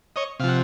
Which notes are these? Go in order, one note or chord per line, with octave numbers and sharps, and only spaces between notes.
C#5 D#5
C3 F3 F5 F#5